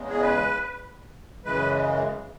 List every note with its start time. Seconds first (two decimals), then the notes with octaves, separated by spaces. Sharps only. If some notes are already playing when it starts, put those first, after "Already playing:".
Already playing: E2 C#3 G#3
0.09 G#4
0.21 B4
1.45 F#2 C#3 E3 G#3 B4